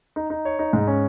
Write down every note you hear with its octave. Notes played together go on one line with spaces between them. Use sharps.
D#4
D#4
C#5
D#4
G#2
C#4